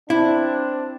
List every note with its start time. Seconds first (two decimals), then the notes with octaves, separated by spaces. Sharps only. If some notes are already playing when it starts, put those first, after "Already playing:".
0.10 C4 D4 E4